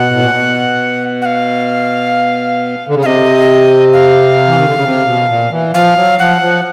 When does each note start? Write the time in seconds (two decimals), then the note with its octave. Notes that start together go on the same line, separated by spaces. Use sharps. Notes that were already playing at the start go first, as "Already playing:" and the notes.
Already playing: B2 F#5
0.11 A2
0.21 A#2
0.31 B2
1.22 F#5
1.25 F5
2.88 D3
2.95 C#3
3.02 C3 F5
3.06 D#5
3.93 F5
4.48 E3
4.57 D#3
4.66 D3
4.75 C#3
4.83 C3
5.06 B2
5.28 A#2
5.51 E3
5.74 F3 F5
5.96 F#3
6.19 F3 F#5
6.42 F3